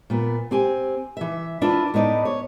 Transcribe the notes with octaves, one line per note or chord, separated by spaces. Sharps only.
A#2 B3
C4 G4 G#5
E3 E5
D4 E4 F4 B4
A2 B3 D#4 D5
C#5